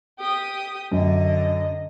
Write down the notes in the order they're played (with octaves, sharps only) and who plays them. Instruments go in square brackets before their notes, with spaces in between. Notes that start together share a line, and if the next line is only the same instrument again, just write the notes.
[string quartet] G4 D#6
[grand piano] F#2 [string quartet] D3 D#5